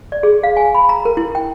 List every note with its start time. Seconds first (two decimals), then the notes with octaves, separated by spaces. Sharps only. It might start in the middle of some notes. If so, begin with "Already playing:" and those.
0.12 D5
0.23 G#4
0.43 F5
0.57 G#5
0.75 B5
0.89 A#5
1.05 A#4
1.17 E4
1.35 G5